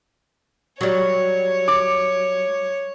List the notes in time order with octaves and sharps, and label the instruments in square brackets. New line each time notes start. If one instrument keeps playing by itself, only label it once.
[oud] F#3 G3 [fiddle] C#5
[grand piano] D6